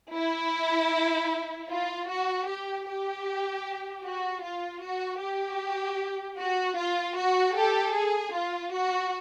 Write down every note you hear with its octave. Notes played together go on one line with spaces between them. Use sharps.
E4
F4
F#4
G4
G4
F#4
F4
F#4
G4
F#4
F4
F#4
G4 A4
G#4
F4
F#4